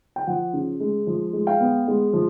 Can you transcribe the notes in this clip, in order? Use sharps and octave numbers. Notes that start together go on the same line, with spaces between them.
G5
F3 F#5
C#3
G#3
F3
G#3
F5 G5
B3
G#3
F3